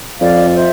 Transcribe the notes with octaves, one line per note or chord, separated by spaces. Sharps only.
F2 D5 F5
C5 E5